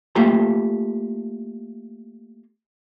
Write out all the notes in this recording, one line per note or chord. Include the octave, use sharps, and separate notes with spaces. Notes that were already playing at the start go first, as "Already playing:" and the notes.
A3 A#3 F4 G4 A#5